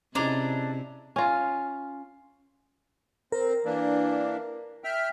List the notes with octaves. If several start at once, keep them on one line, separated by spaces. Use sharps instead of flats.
C3 C#4 D4 E4 G#4 D#5 A#5 D6
C#4 F4
C4 A#4
E3 A#3 D4
E5 G5 F6